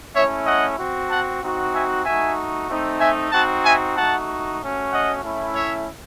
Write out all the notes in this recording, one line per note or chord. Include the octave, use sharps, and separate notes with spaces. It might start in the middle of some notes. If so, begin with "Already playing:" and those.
A3 C#4 E4 C#5 E5
D#5 F#5
C4 F#4
F#5 A5
C4 D#4 F#4
E5 G#5
A3 D#4 F#4 E5 G#5
A3 C4 D#4
E5 G#5
C4 D#4 F#4 F#5 A5
E5 G#5
A3 D#4 F#4 F#5 A5
A3 C#4 F#4
D#5 F#5
A3 C#4 E4
C#5 E5